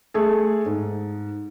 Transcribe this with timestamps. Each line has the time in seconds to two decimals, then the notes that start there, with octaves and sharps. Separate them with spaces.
0.14 A3 G#4 A4
0.66 G#2